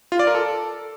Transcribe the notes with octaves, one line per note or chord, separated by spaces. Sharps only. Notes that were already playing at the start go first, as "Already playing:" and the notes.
F4
D5
A#4
A4